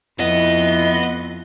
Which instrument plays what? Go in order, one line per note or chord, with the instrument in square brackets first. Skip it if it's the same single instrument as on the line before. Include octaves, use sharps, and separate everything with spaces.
[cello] F2 [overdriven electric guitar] B3 [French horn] E4 [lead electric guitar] D#5